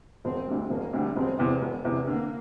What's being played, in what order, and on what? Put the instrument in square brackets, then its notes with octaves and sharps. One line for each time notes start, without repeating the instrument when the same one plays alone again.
[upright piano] E1 [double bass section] C4
[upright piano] D2 D3 G3
[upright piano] E1 [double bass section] A#3
[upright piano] D2 D3 G3
[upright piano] E1 [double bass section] C4
[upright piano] E2 C3
E1
E2 C3
[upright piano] D3 [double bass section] A#3